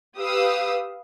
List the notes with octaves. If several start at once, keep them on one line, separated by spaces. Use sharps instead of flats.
G4 B4 F5 D#6 E6